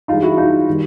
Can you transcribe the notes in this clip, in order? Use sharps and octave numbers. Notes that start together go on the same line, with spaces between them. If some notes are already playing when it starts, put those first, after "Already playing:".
G2 E3 G#3 D#4 F4
E4 F#4
D#4 F4
D#3 G3